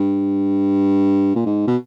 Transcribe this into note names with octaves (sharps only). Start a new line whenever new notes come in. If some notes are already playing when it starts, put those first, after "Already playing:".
Already playing: G2
A#2
G#2
B2